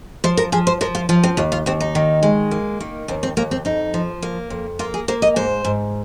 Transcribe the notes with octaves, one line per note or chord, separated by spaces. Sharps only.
F3 C5
A#4
F3 G#4
C5
F3 A#4
F4
F3 F4
C4
D#2 F4
F4
D#2 C4
D#4
D#3
G#3
A#3
D#3
D#2 C4
C4
D#2 A#3
C4
F2 D#4
F3
A#3
F2
A#3 F4
G#4
A#3 C5
D#5
G#2 C5
G#2